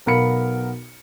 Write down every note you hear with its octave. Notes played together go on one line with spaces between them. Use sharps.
B1 B3 A#4 F5 B5 C#7